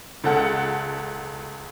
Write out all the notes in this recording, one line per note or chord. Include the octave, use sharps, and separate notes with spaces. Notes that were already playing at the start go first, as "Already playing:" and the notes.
C#2 A4 F#5